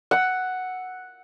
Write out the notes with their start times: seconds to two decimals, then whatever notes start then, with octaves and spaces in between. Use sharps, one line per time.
0.11 F#5 E6